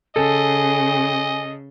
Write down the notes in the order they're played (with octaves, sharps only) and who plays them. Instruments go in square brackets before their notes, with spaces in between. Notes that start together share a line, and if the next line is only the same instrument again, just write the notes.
[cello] C#3 [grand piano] A4 [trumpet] D#5 [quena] G#5